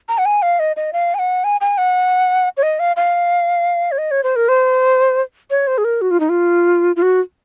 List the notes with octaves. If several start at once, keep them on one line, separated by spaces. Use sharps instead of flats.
A#5
F#5
G#5
F5
D#5
D#5
F5
G#5
F#5
G#5
G#5
F#5
C#5
D#5
F5
F5
C#5
D#5
C#5
C5
A#4
C5
C#5
C5
G#4
A#4
F#4
F4
D#4
F4
F4
F#4